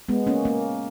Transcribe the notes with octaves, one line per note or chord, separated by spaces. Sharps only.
G#3 B3
A#3 C#4
A#3 C#4